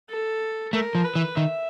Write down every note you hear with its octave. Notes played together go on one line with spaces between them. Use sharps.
A4
A3 A#4
F3
B4
E3
D#3 E5